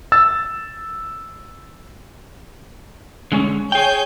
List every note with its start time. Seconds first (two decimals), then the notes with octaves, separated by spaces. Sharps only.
0.12 E6 A6
3.32 D3 G#3 C#4
3.72 G#4 C#5 G5 G#5 G6